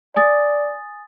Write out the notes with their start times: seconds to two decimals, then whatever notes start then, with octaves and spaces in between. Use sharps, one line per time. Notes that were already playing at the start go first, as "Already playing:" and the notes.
0.16 D5 G#5 D#6 A6